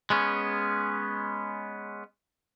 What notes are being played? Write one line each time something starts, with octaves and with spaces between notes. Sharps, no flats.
G#3 B3 C#4